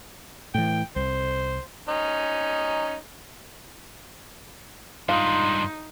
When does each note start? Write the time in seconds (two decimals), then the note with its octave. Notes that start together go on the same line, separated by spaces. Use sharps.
0.55 A2 E3 G5
0.96 C2 C5
1.89 C#4 D#4
5.09 G2 G#3 D#4 F4 C6